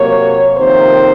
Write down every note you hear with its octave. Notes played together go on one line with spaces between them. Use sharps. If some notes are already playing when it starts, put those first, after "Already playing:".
Already playing: C3 F#3 A#3 C#5
F2 C3 D#3 A#3 C5